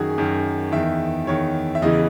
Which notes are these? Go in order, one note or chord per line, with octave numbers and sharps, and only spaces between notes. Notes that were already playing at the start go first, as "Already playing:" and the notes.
Already playing: F#2 D#3 F#4 G#4
F#2 D#3
E2 D#3 E5
E2 D#3 C#5
E5
E2 C#3 E3 D#5